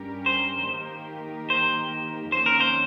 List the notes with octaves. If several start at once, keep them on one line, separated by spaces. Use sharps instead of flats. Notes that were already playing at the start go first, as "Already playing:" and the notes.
Already playing: G2 G3 C#4 G4 A#4
C5
D#3 A#3 D#4 G4 A#4
C5
F2 D#3 A#3 C#4 C5
A#4
C5